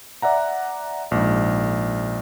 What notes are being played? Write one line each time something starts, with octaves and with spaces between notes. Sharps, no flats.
D5 E5 F#5 A#5
A#1 G#2